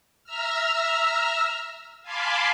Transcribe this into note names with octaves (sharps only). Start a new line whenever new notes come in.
E5 A#5 E6 F6
F5 G#5 A5 B5 C6 D6